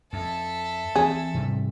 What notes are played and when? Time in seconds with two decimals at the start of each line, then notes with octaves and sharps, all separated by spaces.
0.13 F2 A4 E5
0.96 E3 C4 G#4
1.34 G#2 C3 G3